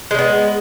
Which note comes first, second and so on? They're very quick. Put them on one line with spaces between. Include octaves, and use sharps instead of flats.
G#3 C#4 B3